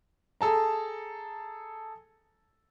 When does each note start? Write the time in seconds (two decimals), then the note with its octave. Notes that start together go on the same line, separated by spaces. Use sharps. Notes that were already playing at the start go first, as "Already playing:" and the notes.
0.41 G#4 A4 A5 A#5